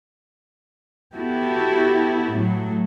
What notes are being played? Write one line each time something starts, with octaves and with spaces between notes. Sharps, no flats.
B3 E4 F#4 G4 A4
A2 F#3